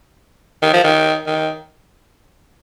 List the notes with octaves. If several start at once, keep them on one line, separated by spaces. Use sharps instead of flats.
D#3
F3
D#3
D#3